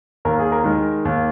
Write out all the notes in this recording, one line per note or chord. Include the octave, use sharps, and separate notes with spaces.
D#2 A#4
G#4
A#4
D#3 G#3
D#2